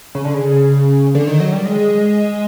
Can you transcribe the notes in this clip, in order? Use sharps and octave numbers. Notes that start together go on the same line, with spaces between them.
C#3
D3
C#3
D3
D#3
F#3
G3
G#3